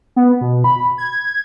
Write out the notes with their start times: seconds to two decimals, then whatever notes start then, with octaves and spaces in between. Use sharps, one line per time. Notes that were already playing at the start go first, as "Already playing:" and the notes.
0.16 B3
0.41 B2
0.64 B5
0.98 G#6